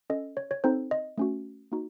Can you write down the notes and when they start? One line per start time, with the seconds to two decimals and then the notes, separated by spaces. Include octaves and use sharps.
0.10 C#4 A4 D#5
0.37 C#5
0.51 C#5
0.64 C4 D#4 A4 C5
0.91 D#5
1.18 A3 C#4 F#4
1.72 A#3 D#4 F#4